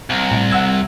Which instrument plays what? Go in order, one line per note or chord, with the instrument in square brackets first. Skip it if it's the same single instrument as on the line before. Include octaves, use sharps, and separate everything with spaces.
[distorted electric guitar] C2
[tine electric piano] A2
F#5 E6 G#6